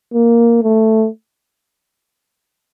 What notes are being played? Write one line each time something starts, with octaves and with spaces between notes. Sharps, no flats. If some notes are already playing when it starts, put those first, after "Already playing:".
A#3
A3